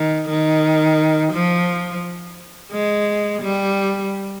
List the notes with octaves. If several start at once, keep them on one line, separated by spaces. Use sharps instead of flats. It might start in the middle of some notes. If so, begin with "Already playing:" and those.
Already playing: D#3
D#3
F3
G#3
G3